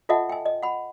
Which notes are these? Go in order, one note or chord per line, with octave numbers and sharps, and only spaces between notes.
F4 A4 D#5 E5 F#5 A5
G5 G#5
D#5
F#5 B5